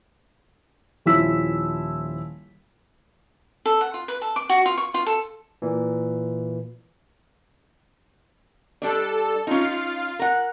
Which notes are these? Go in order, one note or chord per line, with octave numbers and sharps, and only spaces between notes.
D#1 F3 E4 E6 B6
A4
F#5
F4
B4
A4
D6
F#4
F4
C#6
F4
A4
A#2 E3
G3 D4 A4 D5
C#4 D#4 F4 F5
A#4 F#5